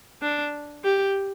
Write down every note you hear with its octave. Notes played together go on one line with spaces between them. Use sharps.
D4
G4